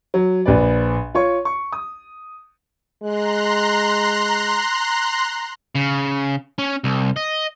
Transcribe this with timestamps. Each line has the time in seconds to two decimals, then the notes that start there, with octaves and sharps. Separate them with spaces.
0.14 F#3
0.46 A#1 B4 D5
1.14 F4 C#5 C#6
1.45 C#6
1.72 D#6
3.03 G#3 A#5 C6 F#6
5.75 C#3
6.58 C#4
6.84 C2
7.16 D#5